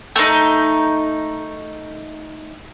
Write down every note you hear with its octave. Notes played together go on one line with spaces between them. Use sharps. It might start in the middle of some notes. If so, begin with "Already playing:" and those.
A3 D#4